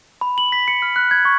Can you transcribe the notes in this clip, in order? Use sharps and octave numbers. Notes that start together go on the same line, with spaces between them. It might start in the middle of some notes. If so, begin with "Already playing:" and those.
B5
F#7
B6
C#7
F6
F#6
G#6
C#6